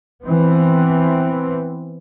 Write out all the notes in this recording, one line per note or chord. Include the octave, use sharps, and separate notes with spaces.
E3 B3 C4